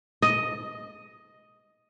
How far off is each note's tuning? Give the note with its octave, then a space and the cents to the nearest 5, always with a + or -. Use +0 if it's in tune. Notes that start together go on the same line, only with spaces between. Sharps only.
D#5 +5